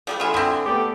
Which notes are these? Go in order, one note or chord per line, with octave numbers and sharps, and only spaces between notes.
F3 G3 A3 D5
D3 F4 E5 G#5 B5 D#6
C4 E4 G5 C6
A3 B3 G4 A4 D5 G5